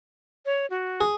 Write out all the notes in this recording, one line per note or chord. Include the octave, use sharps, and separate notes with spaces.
C#5
F#4
G#4